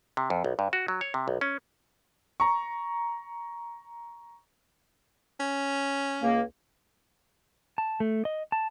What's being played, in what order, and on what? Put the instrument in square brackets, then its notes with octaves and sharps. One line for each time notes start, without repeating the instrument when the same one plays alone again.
[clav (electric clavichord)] C3
F2
B1
G2
F#4
F#3
C#5
C3
B1
C#4
[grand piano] A#5 C#6
[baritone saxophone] C#4
[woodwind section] C#2 A#3
[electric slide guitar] A5
A3
D#5
A5